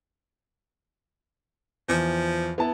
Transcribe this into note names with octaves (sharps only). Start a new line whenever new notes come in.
E2 F3
B3 E4 A5